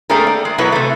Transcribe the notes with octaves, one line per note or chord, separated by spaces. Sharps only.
A3 A#3 C4 D4 G#4 A#4
D5
G#3
B2 F#3 E4 A4 B4
C3 A3